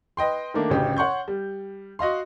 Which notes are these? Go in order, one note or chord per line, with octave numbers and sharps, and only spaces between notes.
B4 D#5 G5 C6
D#3 A3 A#3 D4
A1 D2 C#3 G4
C#5 F#5 C6 C#6 G6
G3
F#4 D#5 F5 C6